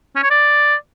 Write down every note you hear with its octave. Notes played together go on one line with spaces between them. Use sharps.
C#4
C#5
D5